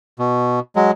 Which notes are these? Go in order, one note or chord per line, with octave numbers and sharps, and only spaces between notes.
B2
F#3 G#3